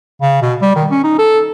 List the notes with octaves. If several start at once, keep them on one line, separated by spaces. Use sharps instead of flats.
C#3
B2
G3
D#3
C#4
D#4
A4